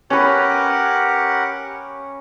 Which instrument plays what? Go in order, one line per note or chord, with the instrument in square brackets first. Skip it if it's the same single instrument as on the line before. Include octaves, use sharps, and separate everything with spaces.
[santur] C#4 B4 [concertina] G4 A#4 F#5